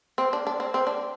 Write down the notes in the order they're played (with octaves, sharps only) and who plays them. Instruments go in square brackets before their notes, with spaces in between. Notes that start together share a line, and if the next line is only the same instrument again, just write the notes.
[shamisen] C4
D4
D4
C4
C4
D4